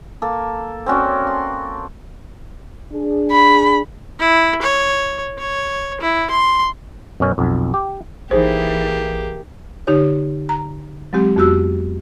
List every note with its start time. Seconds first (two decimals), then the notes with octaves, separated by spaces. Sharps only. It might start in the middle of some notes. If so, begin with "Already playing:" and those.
0.22 A#3 A4
0.86 C4 C#4 F#4 D5
1.27 C6
2.93 D4 G#4
3.31 B5
4.19 E4
4.62 C#5
5.38 C#5
6.01 E4
6.30 C6
7.20 F#2 B2 C#4
7.38 B1 F2
7.74 G4
8.31 A1 E3 A#3 D#4 G4 G#4 C5
9.87 D3 D#4 G4 C#5
10.49 A#5
11.13 F#3 G#3 C4 G4
11.36 F2 B3 F#4 G4 E6